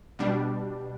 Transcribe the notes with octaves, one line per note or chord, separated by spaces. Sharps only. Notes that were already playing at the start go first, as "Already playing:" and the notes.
B2 G3 D4